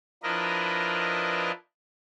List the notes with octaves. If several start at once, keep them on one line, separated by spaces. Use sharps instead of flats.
F3 D4 E4 A#4 B4 D#5